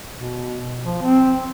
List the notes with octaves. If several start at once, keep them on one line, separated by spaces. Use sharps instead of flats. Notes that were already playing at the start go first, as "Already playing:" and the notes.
B2
F3
C4